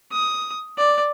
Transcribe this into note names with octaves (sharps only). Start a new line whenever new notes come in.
D#6
D5